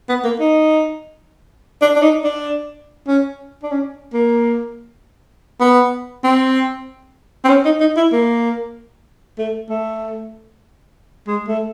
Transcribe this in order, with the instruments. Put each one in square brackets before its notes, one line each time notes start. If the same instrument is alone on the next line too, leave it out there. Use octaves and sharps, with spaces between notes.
[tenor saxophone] B3
A#3
D#4
D4
D4
D#4
D4
C#4
D4
C#4
A#3
B3
C4
C4
C#4
D#4
D#4
E4
A#3
A3
A3
G#3
A3